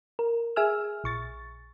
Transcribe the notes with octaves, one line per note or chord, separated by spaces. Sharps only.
A#4
G#4 E5 G#5 E6 F6
A#1 C#6 A6